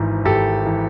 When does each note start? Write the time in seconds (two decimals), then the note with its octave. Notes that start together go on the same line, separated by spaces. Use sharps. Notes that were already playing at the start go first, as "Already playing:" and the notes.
Already playing: G#1 G#2 E3
0.25 G#1 G4 A4
0.66 E3